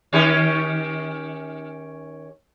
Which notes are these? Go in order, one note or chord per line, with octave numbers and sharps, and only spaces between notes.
D#3 C#4 G4